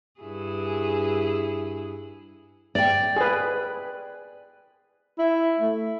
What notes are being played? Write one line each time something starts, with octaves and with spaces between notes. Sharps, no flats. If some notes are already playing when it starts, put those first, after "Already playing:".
G2 E4 G#4
D5 G5
G#4 B4
E4
A3